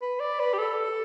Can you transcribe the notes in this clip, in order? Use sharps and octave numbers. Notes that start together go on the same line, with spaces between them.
B4
D5
B4
G4
A4